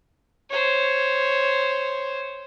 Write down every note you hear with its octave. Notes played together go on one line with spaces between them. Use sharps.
C5 C#5